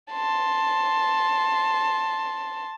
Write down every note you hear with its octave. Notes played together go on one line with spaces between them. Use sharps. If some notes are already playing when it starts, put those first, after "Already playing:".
A5 C6